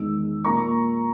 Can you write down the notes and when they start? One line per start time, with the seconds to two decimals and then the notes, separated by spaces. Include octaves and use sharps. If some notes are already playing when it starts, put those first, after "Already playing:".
Already playing: E2 D#3 G#3 E6
0.44 A#2 A#3 A#5 C#6